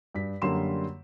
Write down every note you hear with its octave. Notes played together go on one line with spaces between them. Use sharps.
G2 B6
F#2 D3 G3 A#3 C6 E7